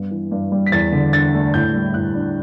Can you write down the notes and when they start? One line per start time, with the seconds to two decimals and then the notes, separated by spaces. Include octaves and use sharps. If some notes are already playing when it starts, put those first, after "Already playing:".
Already playing: G2 B3
0.11 E3
0.32 G2
0.52 G3
0.66 B6
0.72 E2 A6
0.92 D3
1.13 D4 A6
1.34 A3
1.54 A2 G6
1.74 G3
1.94 A2 F#6
2.14 D4